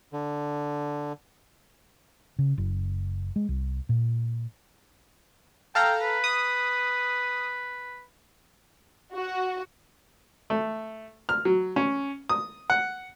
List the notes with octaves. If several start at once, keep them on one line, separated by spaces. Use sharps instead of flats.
D3
C#3
F#1
G#3
C2
A#2
A4 F5 G5 A#5
B4
D#6
F#4
A3
F6
F#3
C#4
D#6
F#5